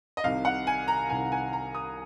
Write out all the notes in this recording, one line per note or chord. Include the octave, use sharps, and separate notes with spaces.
D#5
C2 C3 D#3 F5
F#5
G#5
A#5
C2 C3 D#3 G#5
G#5
A#5
D#6